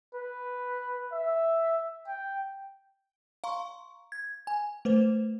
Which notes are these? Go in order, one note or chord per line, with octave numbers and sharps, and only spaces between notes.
B4
E5
G5
F5 A#5 C6 C#6
G#6
G#5
A3 B4 C5